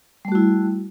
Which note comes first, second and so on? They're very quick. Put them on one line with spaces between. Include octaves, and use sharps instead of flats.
G3 A3 F#4 E4